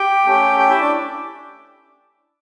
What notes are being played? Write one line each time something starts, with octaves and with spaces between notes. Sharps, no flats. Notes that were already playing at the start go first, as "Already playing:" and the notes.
Already playing: G4 G5
A3 C#4 G4
G4 G5
E4 E5
D4 D5